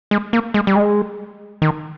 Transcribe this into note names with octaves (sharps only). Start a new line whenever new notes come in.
G#3
A#3
G#3
G3
G#3
D#3